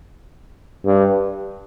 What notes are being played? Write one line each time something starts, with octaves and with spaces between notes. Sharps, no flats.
G2